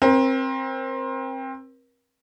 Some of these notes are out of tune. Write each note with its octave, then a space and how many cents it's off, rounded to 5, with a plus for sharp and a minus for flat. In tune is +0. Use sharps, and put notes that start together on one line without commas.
C4 +20 A#4 +40